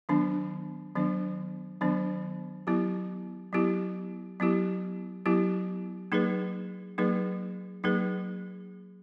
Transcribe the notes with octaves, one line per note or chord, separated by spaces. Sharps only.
D#3 F#3 B3 D4
D#3 F#3 B3 D4
D#3 F#3 B3 D4
F#3 B3 E4 G4
F#3 B3 E4 G4
F#3 B3 E4 G4
F#3 B3 E4 G4
F#3 A#3 D#4 G#4 B4
F#3 A#3 D#4 G#4 B4
F#3 A#3 D#4 G#4 B4